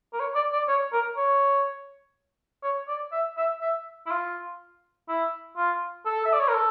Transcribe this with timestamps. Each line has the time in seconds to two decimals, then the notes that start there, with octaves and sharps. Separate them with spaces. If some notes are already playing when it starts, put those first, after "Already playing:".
0.13 A#4
0.20 C#5
0.35 D5
0.53 D5
0.68 C#5
0.93 A#4
1.17 C#5
2.64 C#5
2.88 D5
3.12 E5
3.37 E5
3.61 E5
4.06 E4
4.11 F4
5.09 E4
5.57 F4
6.06 A4
6.26 E5
6.33 D5
6.40 C#5
6.48 A#4
6.55 A4